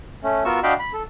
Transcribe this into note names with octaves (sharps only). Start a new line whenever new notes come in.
A3 C#4
B3 F4 F#4 A#4 C#6 E6
D4 F#4 D#5 F5 G5 B5
B5
A4